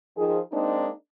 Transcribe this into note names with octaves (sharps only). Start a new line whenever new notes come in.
D#3 F3 G#4
G#3 A#3 C4 D4 D#4